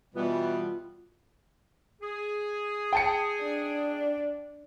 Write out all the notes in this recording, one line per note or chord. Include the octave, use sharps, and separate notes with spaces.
B2 E3 G3 B3 F4
G#4
G5 A5 C#7
D4